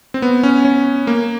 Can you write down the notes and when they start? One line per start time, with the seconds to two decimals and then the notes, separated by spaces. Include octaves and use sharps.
0.14 C4
0.22 B3
0.43 C#4
0.65 C#4
1.07 A#3